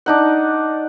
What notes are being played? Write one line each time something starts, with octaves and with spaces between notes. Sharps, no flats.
D4 D#4 F#5